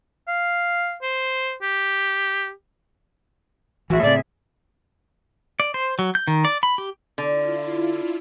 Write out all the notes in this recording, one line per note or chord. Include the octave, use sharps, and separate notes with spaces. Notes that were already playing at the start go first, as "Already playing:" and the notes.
F5
C5
G4
A1 E3 F#4 G#4 E5
A2 C#3 C4 D5
D5
C5
F#3
G6
D#3
D5
B5
G4
D3 E4 F4